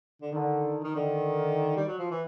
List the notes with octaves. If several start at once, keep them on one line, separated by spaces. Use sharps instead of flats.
D3
D3 D#3
D#3
D3 D#3
G3
F#3
F3
E3